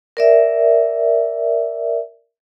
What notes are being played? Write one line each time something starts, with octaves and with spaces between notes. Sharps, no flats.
A#4 D5 E5